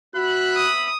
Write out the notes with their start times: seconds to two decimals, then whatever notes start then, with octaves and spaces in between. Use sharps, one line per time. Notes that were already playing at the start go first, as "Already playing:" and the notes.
0.16 B3 F#4 E5 B5 F#6
0.56 D#6